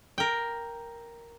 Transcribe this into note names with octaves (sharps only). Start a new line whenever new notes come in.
A#4 G5